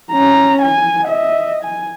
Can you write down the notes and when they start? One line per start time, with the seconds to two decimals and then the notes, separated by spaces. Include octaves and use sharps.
0.12 C#4 A#5
0.62 G#5
1.05 D#5 E5
1.64 G#5